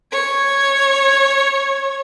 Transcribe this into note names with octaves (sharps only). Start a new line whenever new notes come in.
C#5 G#6